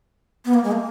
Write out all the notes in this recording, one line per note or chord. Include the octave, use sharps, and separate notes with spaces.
B3
A#3
G#3
A#3